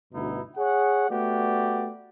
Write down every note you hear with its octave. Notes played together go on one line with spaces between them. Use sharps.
D2 G2 B2 D#4 E4
G#4 C#5 F#5
A3 B3 F#4 G4 D5